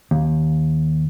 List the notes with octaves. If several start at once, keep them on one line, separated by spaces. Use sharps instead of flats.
D#2